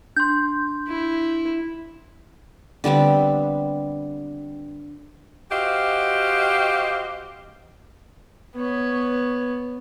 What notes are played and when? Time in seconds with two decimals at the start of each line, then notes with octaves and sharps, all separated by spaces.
0.16 D4 C6 G6
0.88 E4
2.84 D3 G3 B3 C4
5.51 F#4 G4 C5 D#5 F5
8.56 B3 C#5